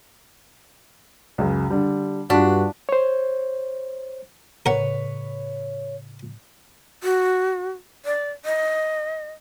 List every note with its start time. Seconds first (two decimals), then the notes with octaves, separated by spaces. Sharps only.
1.38 C#2 F#2 C#3
1.70 D3 G3
2.30 G2 D4 F4 F#4 B6
2.89 C5 C#5
4.66 A2 C#3 A#4 B4 C#5 F#5
7.03 F#4
8.05 D5
8.45 D#5